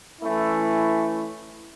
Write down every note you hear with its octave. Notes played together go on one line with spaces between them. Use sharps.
E3 A3 C#4 E4